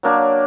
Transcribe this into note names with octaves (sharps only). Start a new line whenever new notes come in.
F#3 A#3 D4